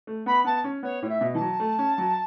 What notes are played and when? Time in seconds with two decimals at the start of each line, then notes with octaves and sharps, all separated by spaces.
0.07 A3
0.26 B3 B5
0.44 B3 A5
0.64 C#4
0.83 B3 C#5
1.02 A2 C#5
1.08 E5
1.21 B2
1.34 E3 A5
1.40 F#3
1.60 A3
1.79 C#4
1.98 F#3